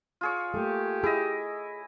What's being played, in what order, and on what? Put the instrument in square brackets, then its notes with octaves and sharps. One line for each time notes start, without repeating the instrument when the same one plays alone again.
[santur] F4 G#4 C#5
[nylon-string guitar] A3 A#3 [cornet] G4
[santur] E4 D#5 [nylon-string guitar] G#4